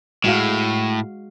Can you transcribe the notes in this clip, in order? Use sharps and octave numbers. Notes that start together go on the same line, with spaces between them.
A2 G#3 F#4 F5